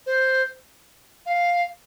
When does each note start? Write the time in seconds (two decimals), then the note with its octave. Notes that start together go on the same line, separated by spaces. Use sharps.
0.06 C5
1.26 F5